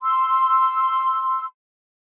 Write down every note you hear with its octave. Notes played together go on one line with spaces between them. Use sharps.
C6 E6